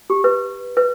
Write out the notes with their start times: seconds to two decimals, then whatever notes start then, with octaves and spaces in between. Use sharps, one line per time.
0.10 G4
0.24 B4
0.77 B4